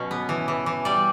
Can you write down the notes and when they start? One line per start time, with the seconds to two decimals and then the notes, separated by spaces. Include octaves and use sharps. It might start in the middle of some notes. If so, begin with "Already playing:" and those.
Already playing: B2 F#3 C#4
0.11 B3
0.29 E3
0.48 E3
0.66 E3
0.85 G3 D5